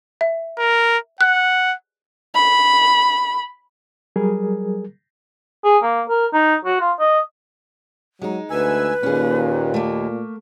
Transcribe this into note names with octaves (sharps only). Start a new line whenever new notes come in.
E5
A#4
F#5 F#6
B5
F#3 G3 G#4 A#4
G#4
A#3
A#4
D#4
F#4
F4
D#5
F#3 G#3 D#4
D2 B4 G#5 E6
D#2 A#2 C#4 G#4
A3 A#3